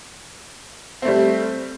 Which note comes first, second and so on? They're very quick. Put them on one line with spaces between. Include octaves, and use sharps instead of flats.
C4 A3 G3